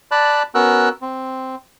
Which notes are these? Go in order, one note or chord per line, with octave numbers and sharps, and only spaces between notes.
D5 A5 B5 F#6
B3 C#4 F#4 A#4 E6 F#6
C4